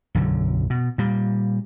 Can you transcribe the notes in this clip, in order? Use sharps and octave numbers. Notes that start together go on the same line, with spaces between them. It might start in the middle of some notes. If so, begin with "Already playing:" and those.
B1 F#2 D3
B2
A#2 G3